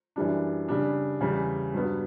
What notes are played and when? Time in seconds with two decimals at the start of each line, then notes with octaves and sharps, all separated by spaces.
0.16 F#2 E3 G3 D4
0.68 C#3 G3 D4
1.20 E2 C#3 G3
1.74 G2 F#3 B3